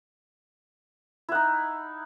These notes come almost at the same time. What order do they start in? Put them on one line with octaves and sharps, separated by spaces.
E4 F#5 D#4